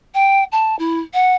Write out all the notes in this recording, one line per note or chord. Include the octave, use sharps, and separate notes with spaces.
G5
A5
E4
F#5